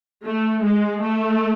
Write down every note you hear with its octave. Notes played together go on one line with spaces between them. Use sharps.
A3
G#3
A3